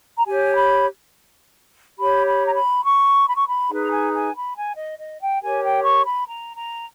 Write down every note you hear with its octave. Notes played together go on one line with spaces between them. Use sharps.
A#5
G4 C#5 G#5
B5
G4 C#5 B5
B5
A#5
B5
C#6
B5
C#6
B5
D#4 G#4 B4
A#5
G#5
G#5
B5
G#5
D#5
D#5
G5
G4 A#4 C#5 G#5
G5
C#6
B5
A#5
A#5